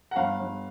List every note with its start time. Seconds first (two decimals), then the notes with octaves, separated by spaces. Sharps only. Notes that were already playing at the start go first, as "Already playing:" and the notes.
0.11 F#5
0.16 G1 F5
0.40 G1